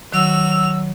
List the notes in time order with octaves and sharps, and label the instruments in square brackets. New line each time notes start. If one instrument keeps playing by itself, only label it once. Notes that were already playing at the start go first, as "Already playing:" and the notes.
[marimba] D#3 [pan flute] F#3 [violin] F#4 F7 [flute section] E6